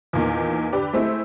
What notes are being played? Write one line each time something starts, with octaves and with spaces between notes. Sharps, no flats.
E2 A#2 D#3
D3 G4 B4 D5
G#3 A3 C4 E4